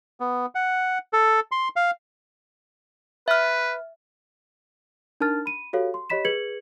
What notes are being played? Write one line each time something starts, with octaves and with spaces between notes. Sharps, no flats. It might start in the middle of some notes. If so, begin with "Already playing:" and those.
B3
F#5
A4
C6
F5
B4 E5 F6
D4 D#4 A#4 A5 F6 A6
B5 D#7
F#4 G4 A4 C#5 F5
C6
G4 C#5 D#5 B5 B6 E7
G#4 B4 G#6 C#7 F#7